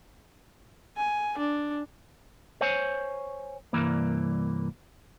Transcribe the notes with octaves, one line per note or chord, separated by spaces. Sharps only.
G#5
D4
C5 C#5 G#5
C2 G2 E3 A#3